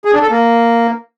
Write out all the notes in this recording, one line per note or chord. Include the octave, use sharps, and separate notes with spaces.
G#4
D4
A4
A#3